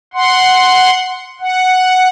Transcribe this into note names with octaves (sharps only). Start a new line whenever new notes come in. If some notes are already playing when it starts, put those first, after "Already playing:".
F#5 C6
F#5